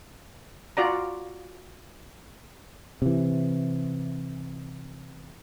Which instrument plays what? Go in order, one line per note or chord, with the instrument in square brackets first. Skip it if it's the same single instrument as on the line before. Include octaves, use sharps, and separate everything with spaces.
[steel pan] F4 F#4 D5 A#5
[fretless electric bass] C3 E3